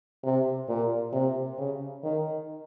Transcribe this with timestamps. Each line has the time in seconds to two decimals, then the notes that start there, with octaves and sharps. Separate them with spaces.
0.23 C3
0.68 A#2
1.13 C3
1.58 C#3
2.04 D#3